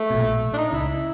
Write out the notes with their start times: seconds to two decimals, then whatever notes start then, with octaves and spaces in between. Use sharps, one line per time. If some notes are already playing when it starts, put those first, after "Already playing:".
Already playing: A3
0.10 B2
0.15 A#1 A#2
0.53 D4
0.58 D#4
0.72 C#2 C#3 E4